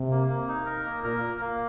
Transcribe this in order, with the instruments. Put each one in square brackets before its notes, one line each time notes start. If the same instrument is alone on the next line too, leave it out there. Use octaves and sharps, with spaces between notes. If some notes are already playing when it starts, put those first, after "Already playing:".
Already playing: [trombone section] C3
[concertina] A#3
A#3
D#4
A#4
A#3
[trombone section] A#2 [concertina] A#4
[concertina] A#3
A#3